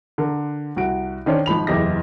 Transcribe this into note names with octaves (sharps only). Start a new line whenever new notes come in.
D3 A#4
C2 F#4 D7
D#3 C#4 D4 C5 C#5
G#1 F3 B5 F7
F#1 E2 G4 D#5 A#6